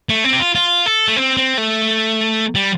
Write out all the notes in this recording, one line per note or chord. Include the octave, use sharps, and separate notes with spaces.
A3
C4
G4
F4
F4
A4
A3
C4
C4
A3
G3